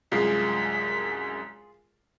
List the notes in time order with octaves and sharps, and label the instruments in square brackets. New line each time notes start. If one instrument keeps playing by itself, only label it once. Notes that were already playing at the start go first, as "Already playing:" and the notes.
[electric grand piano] C2 F#2 G#3 [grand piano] F4 G#4 C7 [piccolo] B6